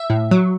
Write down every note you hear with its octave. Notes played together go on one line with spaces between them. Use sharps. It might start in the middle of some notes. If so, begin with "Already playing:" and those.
Already playing: E5
A2
F#3